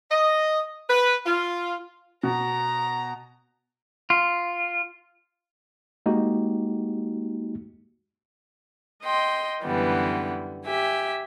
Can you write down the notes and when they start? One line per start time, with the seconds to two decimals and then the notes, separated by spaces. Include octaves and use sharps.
0.11 D#5
0.90 B4
1.26 F4
2.23 B2 A#5
4.10 F4
6.06 G#3 A#3 D#4 F#4 G4
9.03 D#5 G5 C6
9.64 F#2 D3 E3 G3 B3
10.65 G4 E5 G#5